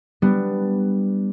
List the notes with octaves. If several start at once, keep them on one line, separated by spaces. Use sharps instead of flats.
G3 B3 D4